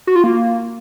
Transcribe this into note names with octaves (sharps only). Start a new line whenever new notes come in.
F#4
F4
A#3